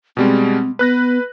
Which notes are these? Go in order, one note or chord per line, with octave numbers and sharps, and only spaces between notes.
B2 G3 G#3 C4
B3 B4 F#6 A#6